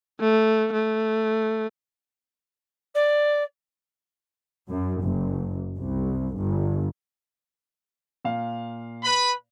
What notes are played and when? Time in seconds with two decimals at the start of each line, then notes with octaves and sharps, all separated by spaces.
0.20 A3
0.73 A3
2.94 D5
4.69 F#2
5.02 F#1
5.76 C2
6.35 G1
8.25 A#2 F5
9.04 B4 B5